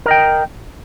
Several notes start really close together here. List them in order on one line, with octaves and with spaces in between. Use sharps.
A#4 D#5 G5